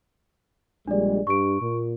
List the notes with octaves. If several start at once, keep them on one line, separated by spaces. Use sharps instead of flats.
A#1 G3 G#3 D4 D5
G2 C#6 D7
A#2